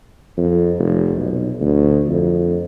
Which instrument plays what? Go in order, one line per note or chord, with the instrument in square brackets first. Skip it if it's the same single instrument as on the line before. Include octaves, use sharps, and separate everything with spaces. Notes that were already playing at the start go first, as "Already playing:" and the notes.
[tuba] F2
F1
B1
D2
F2